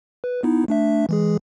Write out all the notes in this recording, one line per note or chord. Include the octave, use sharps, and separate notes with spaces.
B4
B3 D#4 E4
A3 D4 E5
E3 G#3 G#4